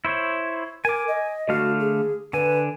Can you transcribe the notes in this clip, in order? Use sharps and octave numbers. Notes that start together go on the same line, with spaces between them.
E4 C5 C#5
A#4 G#5 D6
D#5
D3 A3 F#4 F5
G#4
D3 B4 G#5